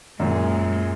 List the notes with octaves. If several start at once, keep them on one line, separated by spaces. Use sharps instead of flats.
F#2 A#2 G#3